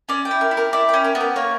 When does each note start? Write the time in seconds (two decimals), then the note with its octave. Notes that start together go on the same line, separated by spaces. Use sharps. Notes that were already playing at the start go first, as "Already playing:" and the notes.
0.09 C#4 D5
0.25 G5
0.31 E4
0.41 A#4
0.51 E4
0.57 A#4
0.73 E4 D5
0.89 C#4 G5
1.04 A#4
1.15 B3
1.21 A#4
1.36 A#3 C#5